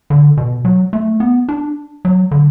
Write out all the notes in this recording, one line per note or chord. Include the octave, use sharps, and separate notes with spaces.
D3
B2
F#3
A3
B3
D4
F#3
D3